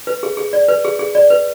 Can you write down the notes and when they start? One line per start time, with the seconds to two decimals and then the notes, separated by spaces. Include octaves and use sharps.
0.07 B4
0.23 G#4
0.37 G#4
0.53 D5
0.68 B4
0.85 G#4
0.99 G#4
1.15 D5
1.30 B4